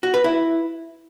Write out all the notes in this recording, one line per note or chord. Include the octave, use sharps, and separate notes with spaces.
F#4
B4
E4